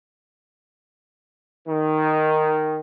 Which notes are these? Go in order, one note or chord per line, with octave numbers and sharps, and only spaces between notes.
D#3